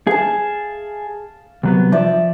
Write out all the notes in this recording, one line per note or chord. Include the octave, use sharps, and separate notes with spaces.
G#4 F5 A5
C2 F#3 B3
F3 D5 E5